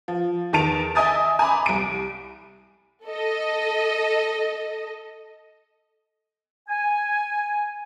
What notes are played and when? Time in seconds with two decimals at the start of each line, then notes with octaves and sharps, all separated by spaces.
0.08 F3
0.53 E2 D#3 A5 D7 F7
0.95 D#5 E5 G#5 D#6 A6
1.39 G#5 A#5 B5 D6
1.66 C2 D7
3.05 A4 D#5
6.68 G#5